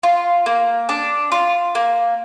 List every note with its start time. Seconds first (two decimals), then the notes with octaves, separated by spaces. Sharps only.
0.03 F4
0.46 A#3
0.89 D4
1.32 F4
1.75 A#3